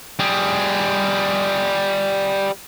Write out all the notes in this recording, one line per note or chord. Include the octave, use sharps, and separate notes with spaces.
G3 G#4